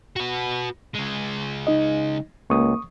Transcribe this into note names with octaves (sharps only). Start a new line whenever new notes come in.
F#4 B4
C#3 G#3
D#4 D#5
C#2 A#3 C#6 D#6